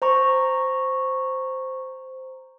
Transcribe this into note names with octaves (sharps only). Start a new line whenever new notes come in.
C5 A#5 C#6